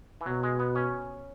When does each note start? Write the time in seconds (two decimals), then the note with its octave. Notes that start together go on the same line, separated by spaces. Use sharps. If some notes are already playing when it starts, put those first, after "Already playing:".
0.21 E3
0.26 B2 F#3
0.43 G#3
0.60 B3
0.75 C#4